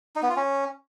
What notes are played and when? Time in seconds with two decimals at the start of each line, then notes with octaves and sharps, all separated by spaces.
0.16 D#4
0.23 B3
0.29 F4
0.36 C#4